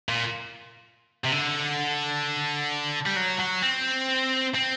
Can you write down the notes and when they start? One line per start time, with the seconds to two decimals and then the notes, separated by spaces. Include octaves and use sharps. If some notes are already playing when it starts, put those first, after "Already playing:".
0.09 A#2
1.24 C3
1.32 D3
3.06 G3
3.16 F#3
3.39 F#3
3.63 C4
4.55 C4